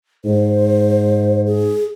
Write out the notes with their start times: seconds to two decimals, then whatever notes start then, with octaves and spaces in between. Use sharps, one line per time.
0.25 G#2 C5
1.46 G#4